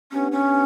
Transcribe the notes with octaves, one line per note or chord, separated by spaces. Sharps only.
B3 C#4 D4 G4 B4 F#5
C#4